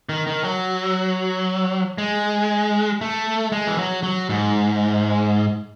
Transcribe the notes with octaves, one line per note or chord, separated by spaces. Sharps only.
D#3
D#3
F#3
G#3
A3
G#3
E3
F#3
F#3
G#2